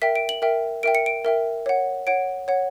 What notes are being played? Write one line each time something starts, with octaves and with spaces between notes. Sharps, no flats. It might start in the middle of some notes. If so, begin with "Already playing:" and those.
A#4 E5 G5 B6
D7
F#7
A#4 E5 G5
A#4 E5 G5 D7
C#7
D7
A#4 E5 G5
C#5 F#5
C#5 F#5 D7
C#5 F#5